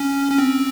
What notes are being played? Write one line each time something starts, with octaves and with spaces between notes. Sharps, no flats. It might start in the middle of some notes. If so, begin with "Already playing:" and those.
Already playing: C#4
C#4
C4